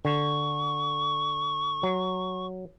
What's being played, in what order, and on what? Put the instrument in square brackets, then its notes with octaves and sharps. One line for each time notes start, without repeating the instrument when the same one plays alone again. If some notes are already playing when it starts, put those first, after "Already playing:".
[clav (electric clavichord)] D3 [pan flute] C#6
[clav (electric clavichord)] F#3